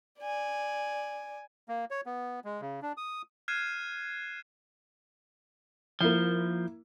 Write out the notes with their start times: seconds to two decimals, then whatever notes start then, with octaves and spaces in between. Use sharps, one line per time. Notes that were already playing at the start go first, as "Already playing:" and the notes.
0.20 D5 G#5
1.69 A#3
1.91 C#5
2.06 B3
2.45 G#3
2.61 C#3
2.82 D4
2.97 D#6
3.48 F6 F#6 G#6 C7 D#7 E7
6.01 F3 A#3 E4